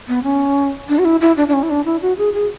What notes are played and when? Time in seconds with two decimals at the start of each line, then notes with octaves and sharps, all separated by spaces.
0.08 B3
0.24 C#4
0.89 D4
0.99 F#4
1.05 E4
1.21 E4
1.37 D4
1.48 D4
1.53 C#4
1.63 E4
1.70 D4
1.85 E4
2.02 F#4
2.18 G#4
2.34 G#4